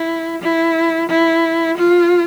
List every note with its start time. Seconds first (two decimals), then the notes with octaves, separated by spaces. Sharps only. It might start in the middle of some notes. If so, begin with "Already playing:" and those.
Already playing: E4
0.42 E4
1.09 E4
1.77 F4